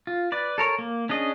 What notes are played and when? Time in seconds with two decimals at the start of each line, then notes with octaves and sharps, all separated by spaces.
0.07 F4
0.32 B4 D5
0.58 A4 A#4 C#5
0.79 A#3
1.09 C#4 D4 G#4 D#5